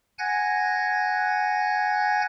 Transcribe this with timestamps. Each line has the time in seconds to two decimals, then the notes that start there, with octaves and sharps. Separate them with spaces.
0.19 F#5 G#5 F#6 G#6 A#6